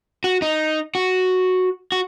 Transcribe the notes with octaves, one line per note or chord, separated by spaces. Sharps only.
F#4
D#4
F#4
F#4